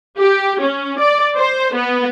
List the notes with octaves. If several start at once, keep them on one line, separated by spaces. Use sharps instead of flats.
G4
C#4
D5
C5
B3